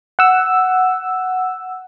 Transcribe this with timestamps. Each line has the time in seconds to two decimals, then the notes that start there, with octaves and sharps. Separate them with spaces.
0.19 F#5 E6